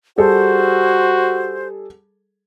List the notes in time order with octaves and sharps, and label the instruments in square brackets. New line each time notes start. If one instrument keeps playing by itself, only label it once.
[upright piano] G3 G#4 A4 [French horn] F#4 [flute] C5